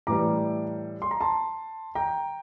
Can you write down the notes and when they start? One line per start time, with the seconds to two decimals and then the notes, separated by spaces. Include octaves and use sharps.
0.07 A2 E3 G3 A#5 D6
1.02 C6
1.11 A#5
1.20 A5 C6
1.95 G5 A#5